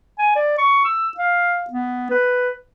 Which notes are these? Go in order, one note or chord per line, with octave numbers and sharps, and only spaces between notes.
G#5
D5
C#6
E6
F5
B3
B4